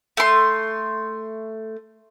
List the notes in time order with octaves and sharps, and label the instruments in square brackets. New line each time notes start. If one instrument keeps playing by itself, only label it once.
[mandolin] A3 C6